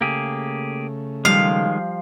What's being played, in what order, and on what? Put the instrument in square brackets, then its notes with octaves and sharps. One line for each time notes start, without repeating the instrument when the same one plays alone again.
[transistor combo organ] C#3 A3 [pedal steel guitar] A#3 G4 G#4
[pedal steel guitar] D#3 G#3 [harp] F3 G3 [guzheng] F5